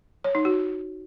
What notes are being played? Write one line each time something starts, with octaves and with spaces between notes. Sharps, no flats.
C#5
D#4
F#4